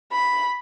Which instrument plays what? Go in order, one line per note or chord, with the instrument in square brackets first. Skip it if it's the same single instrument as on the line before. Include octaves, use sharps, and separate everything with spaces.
[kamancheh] B5